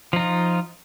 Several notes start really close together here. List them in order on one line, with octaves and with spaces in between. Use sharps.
F3 D#4 F4